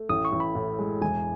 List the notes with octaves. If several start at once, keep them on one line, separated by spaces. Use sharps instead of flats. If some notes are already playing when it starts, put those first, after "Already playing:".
Already playing: A3
A1 D#6
C#6
A1
B5
A2
G#3
E1 G#5